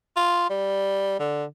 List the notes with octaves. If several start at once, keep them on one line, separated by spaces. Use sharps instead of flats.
F4
G3
D3